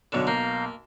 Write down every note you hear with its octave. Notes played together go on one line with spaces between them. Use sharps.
B1 D3 F#3 E7
A#3 F5 A#5 G6